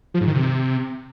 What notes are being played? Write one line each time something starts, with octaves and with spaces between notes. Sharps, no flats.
F3
G#2
D#3
C3